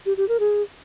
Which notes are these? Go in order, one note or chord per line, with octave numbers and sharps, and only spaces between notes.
G4
G4
A#4
G#4